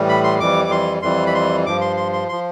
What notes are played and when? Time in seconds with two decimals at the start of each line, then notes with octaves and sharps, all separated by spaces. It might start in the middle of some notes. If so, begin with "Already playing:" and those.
Already playing: A2 E3 G3
0.09 B5
0.24 C6
0.39 F2 E3 G3 D6
0.65 D6
0.71 C6
1.02 F2 E3 G3 C6
1.27 B5
1.34 C6
1.66 G2 F3 D6
1.81 C6
1.97 C6
2.13 C6
2.29 F3 C6